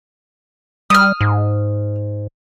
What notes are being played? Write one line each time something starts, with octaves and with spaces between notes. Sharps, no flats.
G3 D#6 F6
G#2